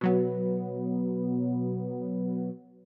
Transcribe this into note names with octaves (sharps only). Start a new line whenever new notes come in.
B2 F#3 B3